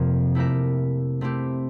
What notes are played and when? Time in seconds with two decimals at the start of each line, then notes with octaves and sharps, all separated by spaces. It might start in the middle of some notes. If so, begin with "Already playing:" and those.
Already playing: F2 C3 F3 A#3
0.35 A3 E4 G4 A#4 E5
1.21 A3 C4 E4 G4